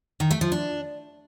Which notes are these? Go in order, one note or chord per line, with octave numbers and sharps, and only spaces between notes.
D#3
A3
F3
D4